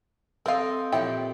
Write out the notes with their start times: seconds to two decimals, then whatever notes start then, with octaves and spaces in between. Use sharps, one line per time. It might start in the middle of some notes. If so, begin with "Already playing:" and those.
0.46 C4 A4 A#4 D#5 F5
0.92 A#2 F3 E4 G4 C#5 G5